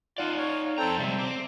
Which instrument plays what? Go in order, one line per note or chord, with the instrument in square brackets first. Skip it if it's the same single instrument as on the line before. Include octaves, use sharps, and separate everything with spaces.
[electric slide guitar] D#4 D5 [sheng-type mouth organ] F4 F#5
[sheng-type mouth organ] C#5 F5
[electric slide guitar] F2 A#5 [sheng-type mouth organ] C4 A4 G5
[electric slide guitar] C3 G3 G#3 [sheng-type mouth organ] E5
[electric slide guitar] C4 [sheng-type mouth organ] D6